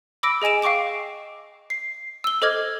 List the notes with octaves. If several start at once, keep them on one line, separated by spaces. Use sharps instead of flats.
B5 D6 E6 A#6 D7
G#4 D#5 G#5 D7 E7
F5 G5 C#6 D6 D7
C7
E6 G7
A4 C5 D#5 D6 F6 G#6